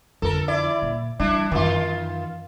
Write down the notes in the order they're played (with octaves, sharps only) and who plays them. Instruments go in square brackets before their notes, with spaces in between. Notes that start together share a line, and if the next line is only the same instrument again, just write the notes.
[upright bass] F2 D3 [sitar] A4 A#4
[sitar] E4 D5
[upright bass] A#2
[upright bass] E3 G3 [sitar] D4 E4
[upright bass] F#2 E3 [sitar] D#3 F4